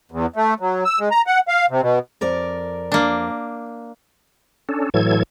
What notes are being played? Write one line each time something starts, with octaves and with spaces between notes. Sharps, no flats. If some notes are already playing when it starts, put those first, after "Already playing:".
E2
A3
F#3
E6
G#3
A#5
F#5
F5
C3
B2
F2 A#4 D5
A#3 D4
C#4 D4 A4
A2 E3 F#3 A4 G#6